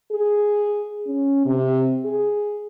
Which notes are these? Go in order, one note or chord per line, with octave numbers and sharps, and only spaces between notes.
G#4
C#4
C3
G#4